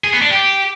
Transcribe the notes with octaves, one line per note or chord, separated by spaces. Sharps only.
G#4
B3
D4
G4